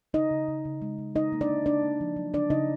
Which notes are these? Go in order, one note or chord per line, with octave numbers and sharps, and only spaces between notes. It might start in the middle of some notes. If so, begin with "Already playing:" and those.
C#3 D#4 D#5
C#3
C#3
C#3
G#3
C#3
C#3 D#4 D#5
A#3
D4 D5
A#3
C#3 D4 D5
A#3
F3
F#3
C#3 D4 D5
C#3 D#4 D#5